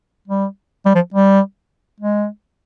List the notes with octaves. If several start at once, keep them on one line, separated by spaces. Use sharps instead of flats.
G3
G3
F3
G3
G#3